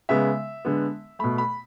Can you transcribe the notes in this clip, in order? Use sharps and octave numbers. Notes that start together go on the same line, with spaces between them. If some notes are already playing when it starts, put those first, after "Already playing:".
C#3 G#3 B3 E5
D3 G#3 B3
B2 A3 B5
B5